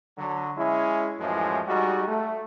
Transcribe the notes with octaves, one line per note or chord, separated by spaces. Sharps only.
D3 F#3
G#3 C#4 E4
F#2 A2 E3 F3 G#3
G3 G#3 D#4 F#4
A3